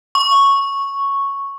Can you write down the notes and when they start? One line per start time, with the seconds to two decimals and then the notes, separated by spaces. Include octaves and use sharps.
0.15 C#6